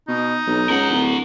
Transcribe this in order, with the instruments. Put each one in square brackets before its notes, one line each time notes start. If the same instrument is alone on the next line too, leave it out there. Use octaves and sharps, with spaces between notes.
[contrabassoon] B2 [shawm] D#4
[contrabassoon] B1
[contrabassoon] C#2 [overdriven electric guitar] A#4 F#5
[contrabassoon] D1